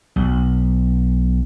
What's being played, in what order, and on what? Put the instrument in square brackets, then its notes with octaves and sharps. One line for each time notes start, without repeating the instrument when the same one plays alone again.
[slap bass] B1